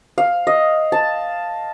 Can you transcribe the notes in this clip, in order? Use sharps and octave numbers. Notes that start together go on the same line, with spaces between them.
F5
D#5
A5